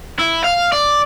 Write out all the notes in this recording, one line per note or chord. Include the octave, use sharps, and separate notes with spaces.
E4
F5
D5